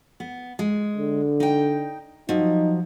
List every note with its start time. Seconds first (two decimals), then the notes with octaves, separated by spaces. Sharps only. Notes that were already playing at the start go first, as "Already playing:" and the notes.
0.20 B3
0.59 G#3
0.97 D3
1.40 D#4 G5
2.29 F3 F#3 D#4